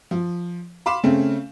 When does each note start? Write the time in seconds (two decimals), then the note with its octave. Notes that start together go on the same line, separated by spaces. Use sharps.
0.11 F3
0.86 F5 B5 C6 D6 E7
1.03 C#3 A3 C4 C#4